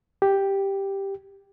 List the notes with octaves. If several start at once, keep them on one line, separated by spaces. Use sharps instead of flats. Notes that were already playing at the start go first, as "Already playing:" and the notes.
G4